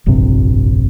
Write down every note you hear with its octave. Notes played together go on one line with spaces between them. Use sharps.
F1 A#1 G2 C3